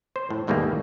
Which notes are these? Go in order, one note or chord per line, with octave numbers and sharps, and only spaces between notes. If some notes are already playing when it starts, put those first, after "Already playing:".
C5
A2
D#2 G#2 B2 G3 A3 A#3